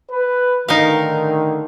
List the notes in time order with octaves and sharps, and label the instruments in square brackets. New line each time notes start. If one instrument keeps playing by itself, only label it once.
[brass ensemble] B4
[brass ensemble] A2 D3 D#3 [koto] D#4 A#4 F5